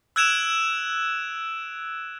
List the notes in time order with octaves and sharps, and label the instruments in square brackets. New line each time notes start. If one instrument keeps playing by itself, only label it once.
[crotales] E6 F#6 G#6 D7 E7 F7